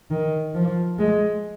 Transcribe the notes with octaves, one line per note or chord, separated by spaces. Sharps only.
D#3
F3
G#3